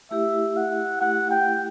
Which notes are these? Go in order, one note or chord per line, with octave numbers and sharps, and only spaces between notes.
A3 E4 G4 E5
F#5
A3 E4 G4 F#5
G5